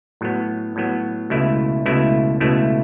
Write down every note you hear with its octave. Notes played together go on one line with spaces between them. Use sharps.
A2 F#3 B3
A2 F#3 B3
C#2 B2 A3 E4
C#2 B2 A3 E4
C#2 B2 A3 E4